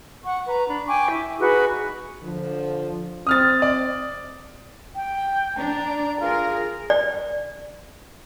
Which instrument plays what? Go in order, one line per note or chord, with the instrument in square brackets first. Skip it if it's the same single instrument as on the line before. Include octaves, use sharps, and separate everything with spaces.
[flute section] F#5 C#6
B4 A#5
D4 B5
G5 G#5 C#6 D6
E4
D#4 F#4 G#4 B4
[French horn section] D3 F3
[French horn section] C4 [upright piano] D#6 F6 A6
[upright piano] D5
[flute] G5
[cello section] D4 [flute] A#5
[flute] F4 [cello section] G#4 A#4
[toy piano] D5